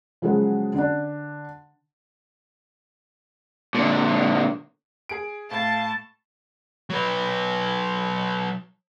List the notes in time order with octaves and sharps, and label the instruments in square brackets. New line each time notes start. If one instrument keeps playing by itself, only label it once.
[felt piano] C#3 F3 F#3 G#3 F#4 G#4
D3 D4
[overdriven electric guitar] A#2 D3
[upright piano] G#4 D7
[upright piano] A2 [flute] F5 [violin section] A5
[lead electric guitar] F#3 B4